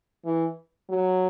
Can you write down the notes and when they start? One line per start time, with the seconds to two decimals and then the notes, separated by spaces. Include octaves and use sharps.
0.25 E3
0.89 F#3